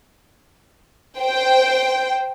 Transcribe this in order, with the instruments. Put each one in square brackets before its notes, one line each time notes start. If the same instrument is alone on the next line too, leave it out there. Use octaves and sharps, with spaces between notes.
[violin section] C5 G5